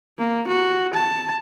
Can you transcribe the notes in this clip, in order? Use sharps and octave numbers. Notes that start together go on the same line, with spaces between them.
A#3
F#4
A5